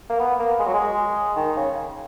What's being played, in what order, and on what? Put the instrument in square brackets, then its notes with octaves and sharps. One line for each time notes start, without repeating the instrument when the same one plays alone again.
[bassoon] A#3
B3
A#3
G#3
F#3
G#3
D#3
C#3